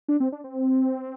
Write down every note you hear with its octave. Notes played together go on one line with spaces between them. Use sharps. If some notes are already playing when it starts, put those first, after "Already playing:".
D4
C4
D4
C4